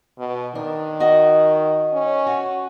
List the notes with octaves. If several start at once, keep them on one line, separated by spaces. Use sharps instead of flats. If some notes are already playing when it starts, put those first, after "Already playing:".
B2
D#3 D4
F#4 D#5
C#4
F#4